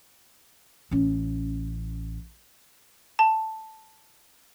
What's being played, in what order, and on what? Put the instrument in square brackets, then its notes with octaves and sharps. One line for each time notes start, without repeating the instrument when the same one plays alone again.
[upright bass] A1 C#4
[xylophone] A5